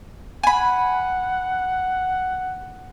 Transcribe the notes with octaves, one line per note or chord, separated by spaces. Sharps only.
F#5 G#5 B5